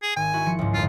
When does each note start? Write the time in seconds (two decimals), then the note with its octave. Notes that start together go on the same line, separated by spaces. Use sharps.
0.03 G#4
0.16 G#1 G#5
0.33 E4 F#4
0.46 F3 G#6 C#7
0.59 C#2 G#2
0.74 G1 F2 F4